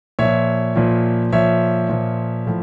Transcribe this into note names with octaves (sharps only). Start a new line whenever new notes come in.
A#2 F3 C#5 E5
A#2 F3
A#2 F3 C#5 E5
A#2 F3
A2 F3